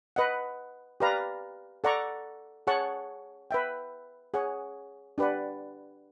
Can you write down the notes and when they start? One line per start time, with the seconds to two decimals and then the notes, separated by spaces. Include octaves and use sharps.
0.16 B4 D#5 F#5
1.00 G4 B4 D5 F5 A#5
1.84 A4 D5 F#5 A#5 C#6
2.67 G#4 C#5 F#5 A5 C#6
3.51 B4 E5 G5
4.34 G#4 C#5 F#5
5.18 D4 G4 B4 D5 F#5